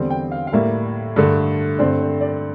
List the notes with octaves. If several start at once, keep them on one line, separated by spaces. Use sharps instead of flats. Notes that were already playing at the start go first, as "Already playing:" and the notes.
Already playing: E2 D3 G3 C4
G5
F5
F5
A2 G3 A#3 E5
G2 D3 A3
G2 D3 A3 C4 D5
C5
D5